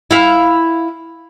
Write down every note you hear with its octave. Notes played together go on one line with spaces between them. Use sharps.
E4 F5